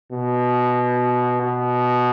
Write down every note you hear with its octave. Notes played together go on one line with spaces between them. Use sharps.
B2
B2